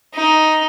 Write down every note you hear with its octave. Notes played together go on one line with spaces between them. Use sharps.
D#4